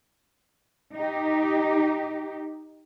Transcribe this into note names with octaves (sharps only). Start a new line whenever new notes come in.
D#4 G4